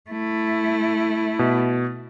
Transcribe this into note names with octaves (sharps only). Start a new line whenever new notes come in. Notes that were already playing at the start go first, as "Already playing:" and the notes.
A3 E4
B2